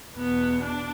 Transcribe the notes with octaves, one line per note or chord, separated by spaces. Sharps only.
E2 B2 B3
D4